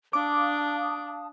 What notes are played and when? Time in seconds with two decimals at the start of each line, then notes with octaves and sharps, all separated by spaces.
0.13 D4 F5 A5 D6 D#6